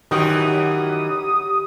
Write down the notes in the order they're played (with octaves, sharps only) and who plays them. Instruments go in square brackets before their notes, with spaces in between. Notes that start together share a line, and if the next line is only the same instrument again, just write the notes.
[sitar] F#2 E3 F#4 [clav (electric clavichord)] D#3 G5 [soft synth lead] G4 [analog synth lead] D#6